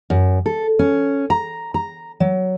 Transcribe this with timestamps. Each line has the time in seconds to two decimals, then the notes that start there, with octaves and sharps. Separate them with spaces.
0.10 F#2
0.46 A4
0.79 C#4
1.30 A#5
1.74 A#5
2.20 F#3